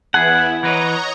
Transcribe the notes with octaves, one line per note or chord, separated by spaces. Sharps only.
E2 B3 E4 G#4 F#5
E3 B4 C#5 D#5 A#5